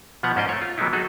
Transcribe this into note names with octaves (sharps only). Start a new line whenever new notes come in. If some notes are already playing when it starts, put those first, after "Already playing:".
B2 F3 B3 F#5 A#5
G#2 C#4 C5 D5 D#5
A3 C#5
F4
E3 F#3 G#3 B3 D#4 E4
F#3 D#4 F#4 G#4 A4